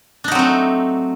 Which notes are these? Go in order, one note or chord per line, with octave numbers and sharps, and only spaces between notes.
F#3 A3 C4 D4 D#4